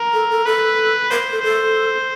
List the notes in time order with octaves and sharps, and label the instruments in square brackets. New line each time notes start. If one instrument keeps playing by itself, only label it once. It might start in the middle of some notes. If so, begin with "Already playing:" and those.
Already playing: [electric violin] A#4
[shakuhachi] A4
A4
[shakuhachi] A4 [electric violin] B4
[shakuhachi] A#4 [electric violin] C5
[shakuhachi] A4
[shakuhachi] A4 [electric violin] C5